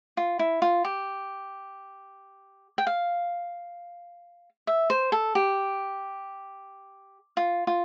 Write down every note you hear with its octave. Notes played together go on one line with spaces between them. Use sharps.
F4
E4
F4
G4
G5
F5
E5
C5
A4
G4
F4
F4